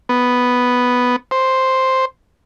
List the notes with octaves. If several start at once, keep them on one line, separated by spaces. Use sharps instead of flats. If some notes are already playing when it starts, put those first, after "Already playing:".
B3
C5